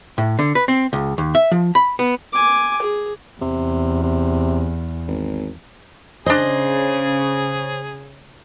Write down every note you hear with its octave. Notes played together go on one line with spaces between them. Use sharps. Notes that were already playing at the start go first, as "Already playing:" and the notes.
A2
D3
B4
C4
C#2
D#2
E5
F3
B5
B3
G#5 D6
G#4
E2 C3
C3
G#1
C#3 D4 G#4 C5 D#5